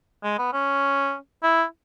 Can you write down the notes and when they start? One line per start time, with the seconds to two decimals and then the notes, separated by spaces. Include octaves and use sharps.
0.23 G#3
0.38 B3
0.53 C#4
1.43 E4